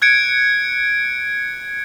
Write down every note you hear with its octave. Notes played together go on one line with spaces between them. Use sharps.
F#6 G#6 C#7 D7